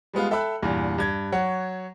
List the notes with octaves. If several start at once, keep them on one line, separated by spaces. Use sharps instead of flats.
G3 G#3 B3 F4
A4 E5 G5 B5 E6 F#6
E2 G2 A#2
G2 G#6
F#3 C#5 F#5